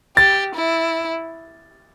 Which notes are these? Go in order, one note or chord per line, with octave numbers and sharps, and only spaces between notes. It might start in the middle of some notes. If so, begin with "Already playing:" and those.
G4 A6
E4